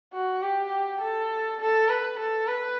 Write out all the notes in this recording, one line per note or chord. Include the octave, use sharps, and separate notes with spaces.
F#4
G4
A4
A4
B4
A4
B4